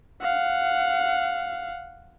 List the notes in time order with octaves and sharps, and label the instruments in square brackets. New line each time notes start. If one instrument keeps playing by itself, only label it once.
[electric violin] F5 F#5